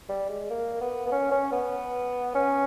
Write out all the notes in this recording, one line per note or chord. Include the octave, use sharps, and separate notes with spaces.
G3
G#3
A#3
B3
B3
C#4
C#4
B3
C#4